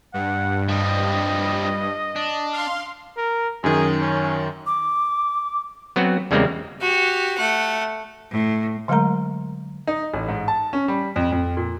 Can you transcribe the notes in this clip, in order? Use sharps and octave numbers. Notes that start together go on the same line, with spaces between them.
G2 F#5
F3 G3 D#5
D4
F5 C6
A#4
F#2 D#3 G#4
C#4
D6
F#3 B3 C4 F#4
E2 C#3 G3 G#3 A#3 C4
F#4 G4
A3 F#5
A2
D3 F#3 G#3 A3 A#4 A#5
D#4
A1
G#2
A5
C#4
G3
F2
F2
A#2